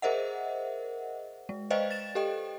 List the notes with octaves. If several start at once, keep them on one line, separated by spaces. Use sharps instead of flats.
G#4 A#4 C5 D#5 E5 F#5
G#3
B4 C5 D5 D#5 F5 G5
A6 E7
G4 A4 D#5 G5